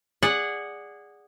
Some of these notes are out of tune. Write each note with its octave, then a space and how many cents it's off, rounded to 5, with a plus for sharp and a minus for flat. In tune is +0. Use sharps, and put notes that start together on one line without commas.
G#4 -15 D5 +0 F#5 +0